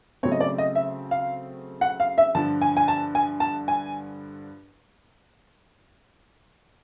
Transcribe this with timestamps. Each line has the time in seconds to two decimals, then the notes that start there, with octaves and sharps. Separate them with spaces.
0.23 C#3 F#3 A3 C4 C#5
0.32 D#5
0.40 D5
0.58 D#5
0.75 E5
1.11 F5
1.81 F#5
2.00 F5
2.18 E5
2.35 G2 D3 F3 A5
2.62 G#5
2.77 G#5
2.88 A5
3.15 G#5
3.40 A5
3.68 G#5